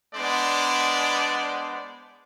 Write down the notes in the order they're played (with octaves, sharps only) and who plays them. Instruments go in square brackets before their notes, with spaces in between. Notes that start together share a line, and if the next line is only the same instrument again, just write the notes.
[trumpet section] G#3 B3 D4 C5 D5